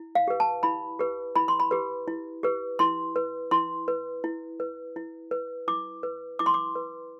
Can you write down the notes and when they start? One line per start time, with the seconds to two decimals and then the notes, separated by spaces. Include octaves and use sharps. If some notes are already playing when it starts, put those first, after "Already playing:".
Already playing: E4
0.15 F5
0.28 G4 B4
0.40 A5
0.63 E4 B5
0.99 G4 B4
1.36 E4 B5
1.48 C6
1.60 B5
1.71 G4 B4
2.08 E4
2.43 G4 B4
2.79 E4 C6
3.16 B4
3.51 E4 C6
3.88 B4
4.24 E4
4.60 B4
4.96 E4
5.31 B4
5.68 E4 D6
6.03 B4
6.39 E4 D6
6.46 C6
6.54 D6
6.75 B4